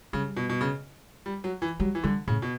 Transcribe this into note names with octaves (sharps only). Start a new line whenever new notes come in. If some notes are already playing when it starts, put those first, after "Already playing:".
C#3 G3
B2
B2
C#3
G3
F#3
E3
F#3 G3
E3
D3 G3
A2 C#3
B2